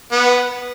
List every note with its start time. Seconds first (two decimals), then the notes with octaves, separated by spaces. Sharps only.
0.12 B3